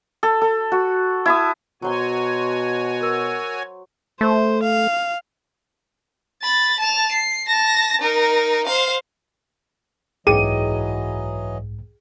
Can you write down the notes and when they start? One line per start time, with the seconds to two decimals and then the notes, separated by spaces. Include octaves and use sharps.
0.23 A4
0.42 A4
0.72 F#4
1.26 E4 A5 D#6
1.82 B2 F#3 F#4 C5 C#5 G#5 C6
3.01 A#4 E6
4.21 A3 C5
4.63 F5
6.42 B5 A6
6.80 A5 F7
7.12 C7
7.48 A5 A#6
8.01 D#4 A#4
8.66 C5 F5
10.27 B1 G#2 E3 F#3 G#4 D#5 G5 D#7